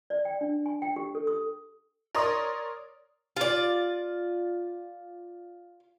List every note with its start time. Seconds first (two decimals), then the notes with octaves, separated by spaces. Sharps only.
0.10 D5
0.25 G5
0.41 D4
0.66 G#5
0.82 G5
0.96 G4
1.15 A4
1.27 D#6
2.15 A#4 C#5 D5 A#5 C6 D#6
3.37 F4 D5